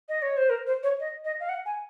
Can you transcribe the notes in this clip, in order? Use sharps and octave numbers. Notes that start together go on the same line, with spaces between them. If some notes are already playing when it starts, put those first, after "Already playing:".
D#5
C#5
C5
A#4
C5
C#5
D#5
D#5
F5
F#5
G#5